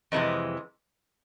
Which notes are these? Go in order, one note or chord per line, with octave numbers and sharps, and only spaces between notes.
F2 C3 E3 G#3